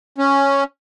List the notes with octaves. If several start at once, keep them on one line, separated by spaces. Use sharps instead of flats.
C#4